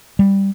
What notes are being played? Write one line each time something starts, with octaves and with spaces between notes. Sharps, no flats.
G3